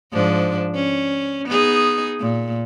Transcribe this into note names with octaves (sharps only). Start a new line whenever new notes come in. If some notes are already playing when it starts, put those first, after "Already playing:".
G#2 F3 D4
C#4
B3 D#4 G#4
A#2